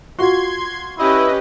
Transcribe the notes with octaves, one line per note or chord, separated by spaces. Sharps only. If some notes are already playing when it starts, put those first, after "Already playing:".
F4 F#4 C6 G#6
C#4 E4 G4 B4 D#5